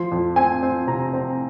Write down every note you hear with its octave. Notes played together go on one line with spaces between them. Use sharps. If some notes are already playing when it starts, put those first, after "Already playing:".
Already playing: F3 C6
F2
C4 G#5
C4
C3 A#5
C4